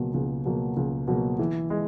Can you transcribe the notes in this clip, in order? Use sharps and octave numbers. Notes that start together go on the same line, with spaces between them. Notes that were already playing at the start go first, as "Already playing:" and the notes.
Already playing: C#2 B2 F#3 A#3
C#2
B2 F#3 A#3
C#2
B2 F#3 A#3
E3
G#3